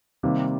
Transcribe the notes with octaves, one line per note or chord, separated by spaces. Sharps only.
C3 D#3 G3 A#3